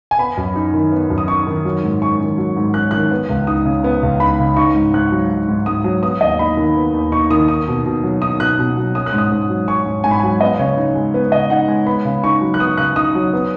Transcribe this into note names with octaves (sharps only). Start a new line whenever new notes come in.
G#5
B3 B5
F#2
D#4
D#3
B3
F#2
D#6
D#4 C#6
D#3
F#3
G#2
C#4 C#6
D#3
F#3
G#2
C#4 F#6
D#3 F#6
B3
C#2
D#4 D#6
C#3
B3
C#2
D#4 B5
C#3
D#4 C#6
G#2
G#2 F#6
F#3
D#4
G#2
G#2 D#6
F#3
B3 D#6
D#2 D#5
D#4 B5
D#3
B3
D#2
D#4 C#6
D#3 D#6
D#4 D#6
B2
B2
F#3
D#4 D#6
B2 F#6
B2
F#3
C#4 D#6
F#6
G#2
D#6
G#2
F#3
C#4 C#6
G#2
G#2 G#5
B5
G#5
F#3
B3 D#5
C#3 C#5
D#4
G#3
B3 B4
C#3 D#5
D#4 F#5
G#3
B3 B5
C#3
D#4 C#6
F#3
F#6
B3 D#6
C#3 F#6
D#4 D#6
F#3
B3